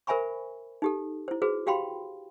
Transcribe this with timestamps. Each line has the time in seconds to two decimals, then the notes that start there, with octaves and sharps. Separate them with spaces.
0.07 A#4 C5 E5 G#5 B5 C#6
0.82 D#4 G4 A4
1.28 E4 C5
1.42 F#4 G#4 B4 C5
1.67 F#4 G4 F5 G5 B5 C6